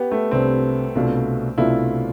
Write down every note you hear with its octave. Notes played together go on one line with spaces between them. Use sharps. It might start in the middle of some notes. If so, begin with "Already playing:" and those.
Already playing: B3 G4
A3
C2 C3 G3 C4 D4
C2 B2 A3 D4 F4
C2 B2 A3 D4 E4 F4